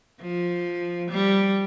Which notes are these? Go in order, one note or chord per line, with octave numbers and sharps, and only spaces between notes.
F3
G3